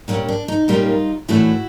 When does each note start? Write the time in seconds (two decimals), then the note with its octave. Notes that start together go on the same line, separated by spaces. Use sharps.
0.08 A#2 G3 A#3 C#4 D4
0.29 D4
0.48 D#4
0.68 A#2 G3 A#3 C#4 D#4 F4
1.28 A2 E3 A3 D4 E4 F#4